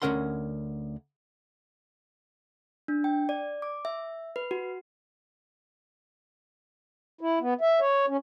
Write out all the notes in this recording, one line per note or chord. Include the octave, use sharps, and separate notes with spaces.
D2 F3 C#4 A#4 F#5 C6
D4
G5
D5
D6
E5
B4
F#4
E4
B3
E5
C#5
C#4